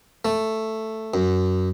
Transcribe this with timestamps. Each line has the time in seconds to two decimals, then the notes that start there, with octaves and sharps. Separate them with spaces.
0.25 A3
1.14 F#2